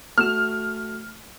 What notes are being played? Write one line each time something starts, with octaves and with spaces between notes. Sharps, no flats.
A3 F#4 F6 E7